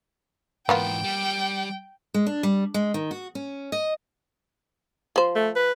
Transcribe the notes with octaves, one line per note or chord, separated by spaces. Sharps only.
G#2 E3 A#3 B3 F4 G5
G3
G#3
D4
G3
G#3
D#3
F#4
C#4
D#5
F3 C5
A3
B4